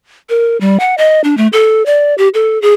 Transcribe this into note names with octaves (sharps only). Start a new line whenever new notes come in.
A#4
G3
F#5
D#5
D4
A3
A4
D5
G4
A4
G#4